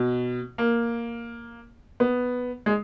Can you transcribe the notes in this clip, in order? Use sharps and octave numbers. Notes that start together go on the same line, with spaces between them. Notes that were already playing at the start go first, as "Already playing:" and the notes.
Already playing: B2
A#3
B3
G#3